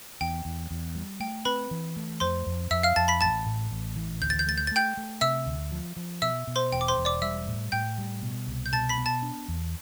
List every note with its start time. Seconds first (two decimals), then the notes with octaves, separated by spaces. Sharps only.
0.21 E2 G5
0.45 E2
0.71 E2
0.95 G3
1.20 A3 G5
1.45 C4 B4 B5
1.71 E3
1.96 A3
2.20 F2 C5 C6
2.47 F2
2.71 F2 E5 E6
2.83 F5 F6
2.96 F2 A5 A6
3.08 B5 B6
3.21 A1 A5 A6
3.46 A2
3.71 A1
3.96 E3
4.21 D2 G6
4.30 A6
4.39 G6
4.47 A3 A6
4.58 G6
4.67 A6
4.72 A3 G5 G6
4.97 A3
5.21 C3 E5 E6
5.46 D2
5.72 F3
5.96 F3
6.22 B2 E5 E6
6.47 B2
6.56 C5 C6
6.72 E1 G5
6.81 D6
6.88 C5 C6
6.97 E1
7.05 D5 D6
7.22 G3 E5 E6
7.47 A2
7.72 A2 G5 G6
7.98 G3
8.22 B2
8.47 C2
8.66 G6
8.73 B2 A5 A6
8.89 B5 B6
8.98 B3
9.06 A5 A6
9.22 D4
9.48 E2